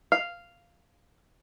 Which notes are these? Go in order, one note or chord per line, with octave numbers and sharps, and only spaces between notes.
F5